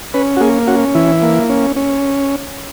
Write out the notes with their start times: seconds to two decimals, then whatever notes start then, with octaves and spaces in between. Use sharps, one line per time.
0.14 C#4 B4
0.37 F#4
0.41 A#3 G#4
0.67 C#4 F#4
0.95 E3 E4
1.22 A#3
1.49 C#4
1.76 C#4